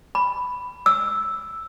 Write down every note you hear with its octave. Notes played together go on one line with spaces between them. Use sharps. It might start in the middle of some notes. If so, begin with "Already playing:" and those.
B5
E6